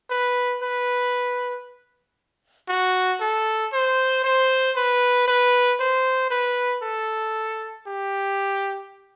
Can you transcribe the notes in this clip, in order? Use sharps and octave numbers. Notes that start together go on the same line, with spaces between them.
B4
B4
F#4
A4
C5
C5
B4
B4
C5
B4
A4
G4